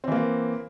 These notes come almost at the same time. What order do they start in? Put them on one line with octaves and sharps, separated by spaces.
C4 E3 A#3